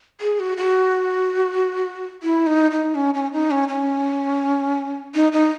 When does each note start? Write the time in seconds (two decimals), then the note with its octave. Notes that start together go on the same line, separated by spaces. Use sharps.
0.21 G#4
0.40 F#4
0.57 F#4
2.23 E4
2.47 D#4
2.71 D#4
2.95 C#4
3.14 C#4
3.33 D#4
3.51 C#4
3.69 C#4
5.15 D#4
5.32 D#4